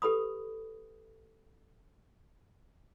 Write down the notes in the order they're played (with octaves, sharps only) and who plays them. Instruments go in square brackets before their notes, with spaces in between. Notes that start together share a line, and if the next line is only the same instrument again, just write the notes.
[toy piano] G4 A4 B4 B5 D#6